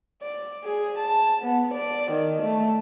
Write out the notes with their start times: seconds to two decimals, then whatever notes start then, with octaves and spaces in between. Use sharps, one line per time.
0.23 D5
0.64 G#4
0.98 A5
1.42 B3
1.74 D5
2.12 D#3
2.43 A3